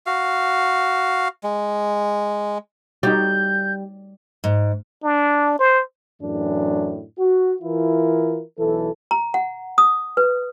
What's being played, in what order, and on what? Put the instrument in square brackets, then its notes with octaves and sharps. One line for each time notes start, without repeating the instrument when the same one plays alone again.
[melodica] F#4 F5
G#3
[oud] G3 [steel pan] D#4 F#4 G4 [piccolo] G6
[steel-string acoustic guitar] G#2
[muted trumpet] D4
C5
[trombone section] F#2 A2 E3 D4
F#4
E3 E4 F4 A#4
B1 E3 A4
[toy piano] A#5
F#5
D#6
B4